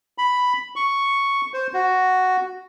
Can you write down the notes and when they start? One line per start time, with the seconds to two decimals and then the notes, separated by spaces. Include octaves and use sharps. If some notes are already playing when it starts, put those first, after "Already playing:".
0.18 B5
0.76 C#6
1.54 C5
1.74 F#4